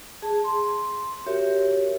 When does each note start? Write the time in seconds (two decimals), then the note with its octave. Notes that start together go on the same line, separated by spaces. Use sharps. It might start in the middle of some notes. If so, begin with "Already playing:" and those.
0.22 G#4 A5
0.44 C6
1.27 F#4 G4 A#4 C#5 E5